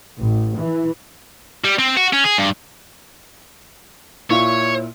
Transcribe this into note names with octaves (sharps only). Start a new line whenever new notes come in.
A1
E3
G3
C4
F#4
C#4
G#4
G2
A#2 E4 F4 C#5